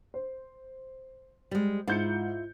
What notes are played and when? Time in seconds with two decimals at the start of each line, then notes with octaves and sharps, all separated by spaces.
0.14 C5
1.51 G3 G#3
1.88 G#2 E4 F4 G6 C#7